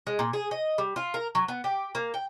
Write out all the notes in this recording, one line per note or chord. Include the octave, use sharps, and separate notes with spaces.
G#3
A#2
G#4
D#5
G3
F4
A#4
F#3
B3
G4
A#3
G5